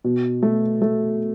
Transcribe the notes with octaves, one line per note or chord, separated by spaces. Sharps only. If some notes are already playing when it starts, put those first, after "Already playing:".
B2
A3
A3